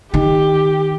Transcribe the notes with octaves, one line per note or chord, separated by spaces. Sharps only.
D#3 G4